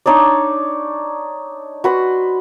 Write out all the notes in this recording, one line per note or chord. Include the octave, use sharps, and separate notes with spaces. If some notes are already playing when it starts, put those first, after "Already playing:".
D4 D#4 C#5 D5
F#4 B4 C6